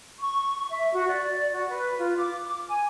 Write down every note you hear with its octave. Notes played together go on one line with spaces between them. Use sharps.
C#6
E5
F#4
D5
D5
F#4
B4
F4
D6
D6
G#5